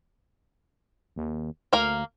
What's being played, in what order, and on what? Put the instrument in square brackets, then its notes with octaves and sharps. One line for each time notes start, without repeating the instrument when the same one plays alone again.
[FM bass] D#2
[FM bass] D2 [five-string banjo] A#3 A#4 F5